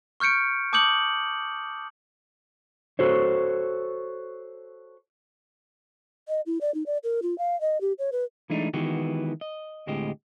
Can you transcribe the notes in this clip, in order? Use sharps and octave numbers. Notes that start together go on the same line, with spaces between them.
C#6 F6 G6 C#7 D7
A5 D6 D#6 G6 C#7 F#7
F#4 A4 C5 C#5
D#5
E4
D5
D#4
D5
A#4
F4
F5
D#5
G4
C#5
B4
E3 G#3 A3 D4 D#4
D#3 E3 G#3 B3 F#4 G4
D#5
D2 A2 G#3 C4 G4 D#5